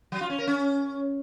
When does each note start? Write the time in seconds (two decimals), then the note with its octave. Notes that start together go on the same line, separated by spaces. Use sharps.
0.12 F#3
0.21 F4
0.30 C#4
0.39 A#4
0.47 C#4